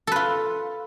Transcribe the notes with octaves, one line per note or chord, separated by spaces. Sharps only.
F4 A4 B4